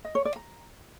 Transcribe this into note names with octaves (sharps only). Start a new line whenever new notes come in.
D#5
C#5
D5
A#5